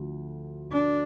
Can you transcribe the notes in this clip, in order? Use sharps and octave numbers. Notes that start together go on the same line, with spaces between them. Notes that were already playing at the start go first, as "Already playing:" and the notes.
Already playing: D2 D3 F3
D4